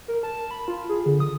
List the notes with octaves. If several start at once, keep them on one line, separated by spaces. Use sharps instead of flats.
A#4
A5
B5
F4
G#4
D3
D#6